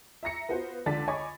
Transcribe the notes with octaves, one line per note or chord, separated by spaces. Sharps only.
E5 A#5 A#6 C#7
B3 F4 F#4 C5
C#2 D3 D5 A5 A6 B6
C#5 D#5 G#5 B5 C#6 D6